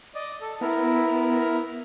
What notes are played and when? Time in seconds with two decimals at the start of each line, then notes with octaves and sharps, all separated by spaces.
0.15 D5 D#5
0.41 A4
0.61 B3 E4 A#4